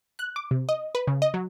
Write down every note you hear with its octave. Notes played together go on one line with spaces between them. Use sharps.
F#6
D6
C3
D#5
B4
C#3
D#5
F#3